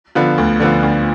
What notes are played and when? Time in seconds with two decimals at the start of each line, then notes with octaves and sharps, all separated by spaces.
0.15 D3 F3 B3 F4
0.38 D2
0.60 D3 F3 B3 F4
0.83 D2